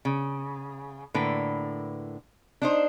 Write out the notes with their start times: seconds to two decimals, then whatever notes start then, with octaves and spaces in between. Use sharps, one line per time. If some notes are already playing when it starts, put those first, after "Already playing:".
0.05 C#3
1.14 A2 D3 A#3 B4
2.62 D4 D#4 C5